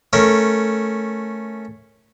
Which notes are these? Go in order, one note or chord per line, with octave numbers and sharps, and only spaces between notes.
A3 C#4 A#4